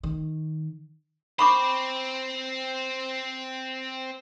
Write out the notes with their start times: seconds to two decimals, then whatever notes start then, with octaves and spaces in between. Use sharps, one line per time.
0.03 D#3
1.39 C4 C5 B5 C#6 D6